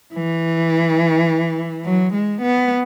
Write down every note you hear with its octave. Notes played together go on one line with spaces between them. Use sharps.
E3
F#3
G#3
B3